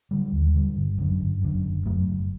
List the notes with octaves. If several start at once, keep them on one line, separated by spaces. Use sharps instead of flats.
D3 G3
D#2
D3 G3
G1
F#2 D3
G1
F#2 D3
F#1
F#2 F#3 A3
F#1